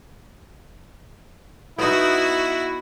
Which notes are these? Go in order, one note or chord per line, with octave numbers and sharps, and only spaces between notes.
B3 D#4 E4 F#4